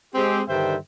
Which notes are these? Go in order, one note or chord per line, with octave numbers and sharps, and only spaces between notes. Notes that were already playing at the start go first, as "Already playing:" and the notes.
G#3 C4 G4
G2 D3 D#3 C5 E5 G5